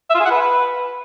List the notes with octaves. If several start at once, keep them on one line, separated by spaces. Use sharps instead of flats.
E5
F4
G#4
F#5
B4